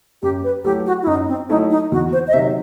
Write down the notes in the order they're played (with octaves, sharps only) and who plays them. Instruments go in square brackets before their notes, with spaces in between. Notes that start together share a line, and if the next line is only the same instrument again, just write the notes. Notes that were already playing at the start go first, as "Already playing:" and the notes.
[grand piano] F#2 [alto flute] G4
[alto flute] B4
[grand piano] F#3 A3 E4 A4 [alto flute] G4
[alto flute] F#4
E4
[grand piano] F#2 [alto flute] D#4
[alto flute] C4
[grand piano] F#3 A3 E4 A4 [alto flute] D#4
[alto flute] D#4
[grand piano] E2 [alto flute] F#4
[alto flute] C5
D#5
[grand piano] C3 D#3 F#3 [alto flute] E5